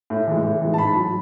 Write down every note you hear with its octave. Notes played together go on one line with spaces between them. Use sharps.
A2
E3 G#3
A2
E3 G#3
A5
G#2 B5
F#3